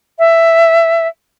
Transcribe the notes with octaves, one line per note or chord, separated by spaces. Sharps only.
E5